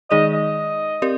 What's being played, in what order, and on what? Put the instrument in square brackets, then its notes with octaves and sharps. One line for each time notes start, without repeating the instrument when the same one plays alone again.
[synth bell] D#3 G#3 D#4 G#4 D5 [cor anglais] D#5
[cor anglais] D#5
[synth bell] C4 G4 A#4 D5